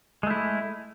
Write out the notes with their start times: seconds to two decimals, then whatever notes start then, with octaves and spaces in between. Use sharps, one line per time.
0.23 G#3
0.27 A3
0.30 E4